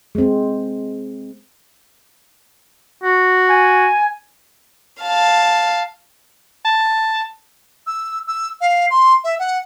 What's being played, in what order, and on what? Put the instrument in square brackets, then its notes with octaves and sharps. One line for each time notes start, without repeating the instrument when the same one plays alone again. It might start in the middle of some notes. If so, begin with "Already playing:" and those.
[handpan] G#3 C4
[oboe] F#4
[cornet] G#5
[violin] F5 A5
[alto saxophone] A5
[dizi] E6
E6
F5
C6
E5
F#5